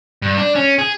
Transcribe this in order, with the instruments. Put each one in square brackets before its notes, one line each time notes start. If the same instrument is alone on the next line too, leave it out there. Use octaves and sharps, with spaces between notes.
[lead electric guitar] G2
D4
C#4
G#4